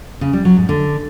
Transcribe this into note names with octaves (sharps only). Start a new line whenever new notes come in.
C#3
G3
F#3
G#2
D3